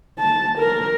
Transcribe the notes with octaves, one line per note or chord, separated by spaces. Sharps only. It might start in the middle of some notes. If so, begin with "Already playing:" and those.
A5
A#4